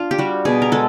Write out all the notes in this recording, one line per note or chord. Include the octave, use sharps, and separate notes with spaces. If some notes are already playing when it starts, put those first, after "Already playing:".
Already playing: D4 F4
G4
G3 F#4
B2 G#4
A#4
G#3 A4